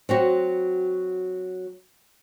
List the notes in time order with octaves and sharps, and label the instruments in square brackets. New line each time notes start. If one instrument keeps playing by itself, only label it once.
[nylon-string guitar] F#3 C4 F#4